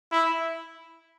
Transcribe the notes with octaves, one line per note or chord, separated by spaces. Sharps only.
E4